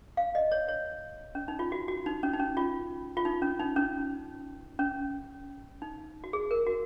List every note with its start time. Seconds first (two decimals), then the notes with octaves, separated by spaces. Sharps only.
0.17 F5
0.35 D#5
0.52 C#5
0.69 C#5
1.35 C#4
1.48 D#4
1.59 F4
1.72 F#4
1.88 F#4
2.06 D#4
2.23 C#4
2.33 D#4
2.40 C#4
2.57 F4
3.17 F4
3.25 D#4
3.42 C#4
3.60 D#4
3.76 C#4
4.79 C#4
5.82 D#4
6.24 F#4
6.33 G#4
6.51 A#4
6.67 F#4